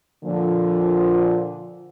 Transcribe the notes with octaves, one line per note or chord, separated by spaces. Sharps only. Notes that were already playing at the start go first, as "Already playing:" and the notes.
A#2 D3 F3